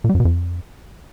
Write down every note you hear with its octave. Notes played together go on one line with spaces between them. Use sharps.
A#2
G3
F#2
B2
F2